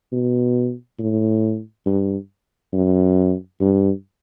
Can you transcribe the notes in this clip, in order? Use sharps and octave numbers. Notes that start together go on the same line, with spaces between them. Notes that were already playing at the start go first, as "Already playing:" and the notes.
B2
A2
G2
F#2
G2